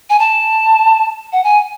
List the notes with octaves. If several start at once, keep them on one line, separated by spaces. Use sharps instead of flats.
G#5
A5
F#5
G#5